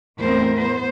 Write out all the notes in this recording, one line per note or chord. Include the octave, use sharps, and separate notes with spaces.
E2 A2 A3 C4 A#4 C5
B3 C5